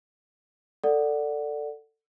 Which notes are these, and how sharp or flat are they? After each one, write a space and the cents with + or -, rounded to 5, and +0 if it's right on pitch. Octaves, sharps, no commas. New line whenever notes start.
A4 +20 D5 +0 F#5 +0